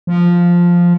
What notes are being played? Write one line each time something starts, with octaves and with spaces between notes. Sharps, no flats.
F3